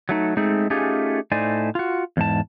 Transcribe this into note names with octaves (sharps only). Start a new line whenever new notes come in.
F#3 A3 D#4
G#3 A3 C4 D#4 G#4
A3 C#4 D#4 F4 G4 G#4
A2 A3 D#4 C5 D5 G#5
F4 F#4
E2 G#2 A5